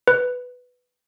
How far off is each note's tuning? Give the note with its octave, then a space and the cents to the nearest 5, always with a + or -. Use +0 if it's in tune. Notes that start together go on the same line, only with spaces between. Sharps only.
B4 +5